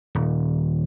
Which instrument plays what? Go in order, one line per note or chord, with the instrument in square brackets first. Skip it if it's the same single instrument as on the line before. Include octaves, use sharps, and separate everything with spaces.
[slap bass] D#1